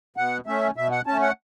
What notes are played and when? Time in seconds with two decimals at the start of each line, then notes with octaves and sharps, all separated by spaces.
0.17 B2 F#5
0.46 A3 C#4 E5
0.76 B2 E5
0.91 F#5
1.07 A3 C#4 A5
1.22 F#5